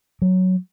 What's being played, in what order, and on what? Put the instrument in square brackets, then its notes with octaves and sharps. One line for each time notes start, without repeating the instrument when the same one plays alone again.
[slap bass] F#3